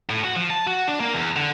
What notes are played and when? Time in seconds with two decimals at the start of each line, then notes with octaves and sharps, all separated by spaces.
0.10 A2
0.24 F#4
0.36 F3
0.50 A5
0.67 F#4
0.88 D4
1.00 A#3
1.14 E2
1.36 D3